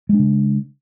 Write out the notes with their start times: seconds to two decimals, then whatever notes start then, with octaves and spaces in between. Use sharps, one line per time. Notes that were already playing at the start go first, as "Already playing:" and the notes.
0.09 G#3
0.14 D4
0.19 C#3